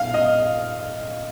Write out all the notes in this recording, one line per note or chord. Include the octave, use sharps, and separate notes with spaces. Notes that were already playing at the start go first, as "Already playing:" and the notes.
Already playing: F5
D#5